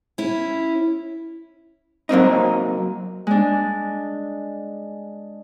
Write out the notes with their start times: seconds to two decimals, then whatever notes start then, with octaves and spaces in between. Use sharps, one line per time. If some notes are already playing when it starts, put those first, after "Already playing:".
0.18 C#4 E4
2.09 F#3 A#3 C4 D#4
3.27 G#3 D4